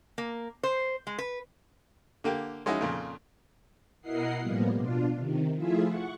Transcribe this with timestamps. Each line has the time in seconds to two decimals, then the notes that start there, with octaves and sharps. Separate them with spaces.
0.18 A#3
0.63 C5
1.07 G#3
1.18 B4
2.24 D3 A#3 G4
2.66 G#3 C#4 D#4 E4 F#4
2.81 F2 A#2 C#3
4.01 B2 E4 A#4 D#5 F#5 C7
4.40 A2 F3 G3 A#3 B3
4.75 B2 D4 F4
5.15 C3 D#3
5.56 F3 A3 E4 F4 G#4 E5
5.87 F#5 C#6